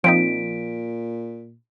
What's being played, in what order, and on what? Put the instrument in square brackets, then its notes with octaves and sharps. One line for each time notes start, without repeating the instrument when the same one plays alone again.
[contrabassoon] A#2 [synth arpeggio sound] F3 C4 D#4 [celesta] B6 D7